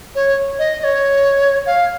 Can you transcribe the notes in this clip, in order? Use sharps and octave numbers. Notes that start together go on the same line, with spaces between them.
C#5
D#5
D#5
C#5
F5